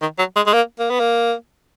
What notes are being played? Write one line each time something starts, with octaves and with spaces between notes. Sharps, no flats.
D#3
F#3
G#3
G#3
A#3
A#3
B3
A#3